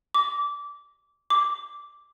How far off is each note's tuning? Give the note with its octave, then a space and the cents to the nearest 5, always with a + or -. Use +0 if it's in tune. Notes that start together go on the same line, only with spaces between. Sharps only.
D6 -20
D6 -5